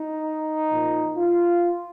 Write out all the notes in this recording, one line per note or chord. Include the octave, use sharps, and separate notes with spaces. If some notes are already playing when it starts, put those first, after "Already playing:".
Already playing: D#4
A#2 F3
F4